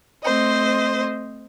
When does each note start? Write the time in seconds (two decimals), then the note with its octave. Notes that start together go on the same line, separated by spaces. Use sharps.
0.23 A3 C4 C5 D#5